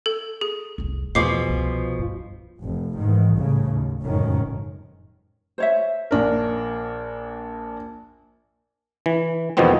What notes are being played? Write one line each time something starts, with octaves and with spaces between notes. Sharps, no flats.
A4
G#4
F1 C2
E2 B2 F3 G#4 D6 C7
C2
G2
F1 F2
G#2 D#3 E3
C2 A2 C#3
D#2
F1 C#2 F#2 A2 D#3 C#4
C5 C#5 E5
A#1 D4 A#4
E3
E2 B2 D#3 F3 B3 C4